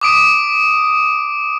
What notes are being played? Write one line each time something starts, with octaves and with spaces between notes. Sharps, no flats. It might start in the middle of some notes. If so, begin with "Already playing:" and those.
D6 D#6 D7 D#7